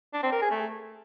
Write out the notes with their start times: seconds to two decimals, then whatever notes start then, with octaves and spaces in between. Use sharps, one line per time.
0.13 D4
0.23 C4
0.32 A#4
0.42 G#4
0.51 A3